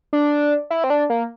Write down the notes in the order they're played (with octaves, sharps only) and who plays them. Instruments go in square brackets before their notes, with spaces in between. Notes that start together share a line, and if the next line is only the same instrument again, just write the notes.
[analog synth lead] D4
E4
C4
D4
A#3